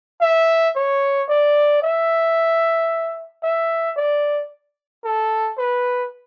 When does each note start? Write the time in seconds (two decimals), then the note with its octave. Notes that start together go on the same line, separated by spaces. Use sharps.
0.21 E5
0.76 C#5
1.29 D5
1.82 E5
3.43 E5
3.96 D5
5.04 A4
5.58 B4